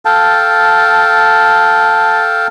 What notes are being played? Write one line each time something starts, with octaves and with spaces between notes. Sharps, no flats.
A4 F5 G5 A5